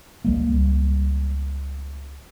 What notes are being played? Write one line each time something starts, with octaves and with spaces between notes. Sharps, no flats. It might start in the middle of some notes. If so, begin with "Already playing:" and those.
C#2 G3 A#3